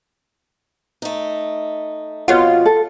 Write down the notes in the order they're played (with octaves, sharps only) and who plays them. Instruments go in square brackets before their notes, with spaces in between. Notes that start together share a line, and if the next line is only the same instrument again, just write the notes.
[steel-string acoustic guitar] A3 D#4
[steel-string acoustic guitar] F2 B2 [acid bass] F4 [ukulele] B4 C#5 F#5
[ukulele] A4